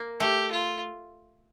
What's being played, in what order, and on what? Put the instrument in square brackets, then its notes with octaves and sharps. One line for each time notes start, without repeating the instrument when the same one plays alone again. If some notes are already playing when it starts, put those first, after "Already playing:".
Already playing: [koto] A#3
[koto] A3 [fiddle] G4
[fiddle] F4